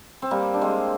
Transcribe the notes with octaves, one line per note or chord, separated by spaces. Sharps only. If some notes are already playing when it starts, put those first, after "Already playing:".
C4
G3 A#3
D4
G#3 C4